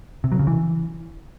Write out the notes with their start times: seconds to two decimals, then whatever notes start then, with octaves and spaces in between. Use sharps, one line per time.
0.24 C3
0.32 F#3
0.39 C#3
0.47 E3